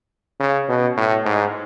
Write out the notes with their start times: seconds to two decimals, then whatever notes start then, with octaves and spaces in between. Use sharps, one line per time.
0.40 C#3
0.68 B2
0.97 A2
1.25 G#2